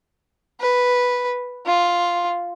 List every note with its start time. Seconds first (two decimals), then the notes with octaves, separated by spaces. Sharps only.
0.60 B4
1.66 F4